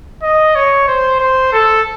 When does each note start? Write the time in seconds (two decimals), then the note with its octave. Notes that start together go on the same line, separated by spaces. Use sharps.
0.22 D#5
0.55 C#5
0.88 C5
1.20 C5
1.53 A4